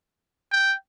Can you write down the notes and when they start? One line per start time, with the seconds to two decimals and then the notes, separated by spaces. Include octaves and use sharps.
0.52 G5